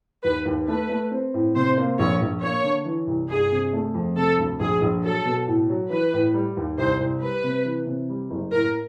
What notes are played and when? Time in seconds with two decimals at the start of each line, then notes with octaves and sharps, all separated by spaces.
0.24 D#2 B4
0.46 D#2
0.68 A3 B4
0.89 A3
1.11 C4
1.34 A2
1.55 C3 C5
1.78 A#3
1.99 A#1 C#5
2.21 A#1
2.42 A#3 C#5
2.64 D3
2.85 E3
3.07 C2
3.29 G1 G#4
3.52 C3
3.73 A3
3.94 F2
4.16 C3 A4
4.38 D2
4.60 A#1 G#4
4.82 A#1
5.04 F#3 A4
5.26 B2
5.47 A2
5.70 F#3
5.90 E3 B4
6.13 A2
6.34 G3
6.57 D#2
6.78 C2 C5
7.00 C2
7.21 G3 B4
7.44 C3
7.65 E3
7.86 C3
8.09 G3
8.30 F#1
8.52 A2 A#4